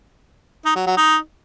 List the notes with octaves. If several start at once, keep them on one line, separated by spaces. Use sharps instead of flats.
D#4
F#3
F#3
D#4